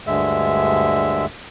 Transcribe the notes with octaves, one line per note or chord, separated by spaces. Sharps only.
D2 G2 D3 G#3 E5